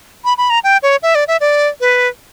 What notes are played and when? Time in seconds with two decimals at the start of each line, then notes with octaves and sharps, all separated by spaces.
0.25 B5
0.38 B5
0.50 A#5
0.64 G5
0.83 C#5
1.03 E5
1.15 D5
1.28 E5
1.41 D5
1.80 B4